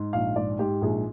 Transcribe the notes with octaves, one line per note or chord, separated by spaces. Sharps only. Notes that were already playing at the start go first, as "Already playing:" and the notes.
Already playing: G#2
A#1 F5
G#2 D5
G#2 G4
A#1 G#4